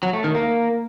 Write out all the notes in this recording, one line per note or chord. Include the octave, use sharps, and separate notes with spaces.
F#3
A3
D#3
A#3